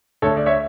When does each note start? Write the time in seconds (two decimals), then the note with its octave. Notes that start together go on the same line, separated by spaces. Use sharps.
0.22 D2 A4 C#5
0.37 D5
0.46 C#5 E5